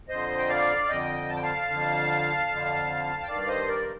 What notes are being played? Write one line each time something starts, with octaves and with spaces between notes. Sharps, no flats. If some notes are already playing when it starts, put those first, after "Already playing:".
F2 D3 C5 D#5
G5
D5 F5
F5
F2 D3 D#5 G5
A5
G5
F5 A5
F2 D3
F2 D3
G5
G2 D#3 D5 F5
C5 D#5
A#4 D5